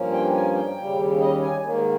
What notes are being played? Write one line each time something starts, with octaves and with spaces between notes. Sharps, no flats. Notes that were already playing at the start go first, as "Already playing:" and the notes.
Already playing: G2 F3 A#3 C#4
G5
G#5
G5
D#2 C#3 G3
D#5
G#5
G#2 D#3 A#3